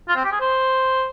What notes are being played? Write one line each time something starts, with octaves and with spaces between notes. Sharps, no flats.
F4
C4
G4
G#4
C5